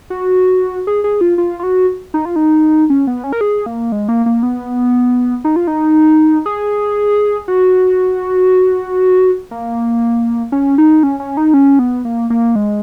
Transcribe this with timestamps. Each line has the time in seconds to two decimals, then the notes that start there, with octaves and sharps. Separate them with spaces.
0.10 F#4
0.87 G#4
1.04 G#4
1.21 F4
1.38 F4
1.59 F4
1.63 F#4
2.14 D#4
2.25 F4
2.36 D#4
2.90 C#4
3.07 B3
3.24 C#4
3.33 A#4
3.41 G#4
3.66 A#3
3.92 G#3
4.09 A#3
4.26 A#3
4.43 B3
5.44 D#4
5.56 F4
5.67 D#4
6.46 G#4
7.48 F#4
9.51 A#3
10.52 C#4
10.78 D#4
11.03 C#4
11.20 C#4
11.37 D#4
11.54 C#4
11.79 B3
12.05 A#3
12.30 A#3
12.56 G#3